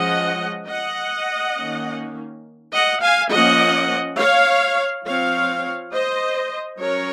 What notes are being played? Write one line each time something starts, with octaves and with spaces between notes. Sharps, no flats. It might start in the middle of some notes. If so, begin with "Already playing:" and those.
Already playing: F3 G#3 C#4 D#5 F#5
D#5 F#5
D#3 A#3 C#4
D#5 F#5
F5 G#5
F3 A#3 C#4 D#5 F#5
C#5 F5
F3 C4 C#5 F5
C5 D#5
F#3 C#4 A#4 C#5